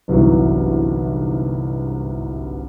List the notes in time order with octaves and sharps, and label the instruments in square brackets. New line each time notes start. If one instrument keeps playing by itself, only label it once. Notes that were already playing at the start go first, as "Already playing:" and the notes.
[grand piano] G1 C2 G#2 C3 E3 F#3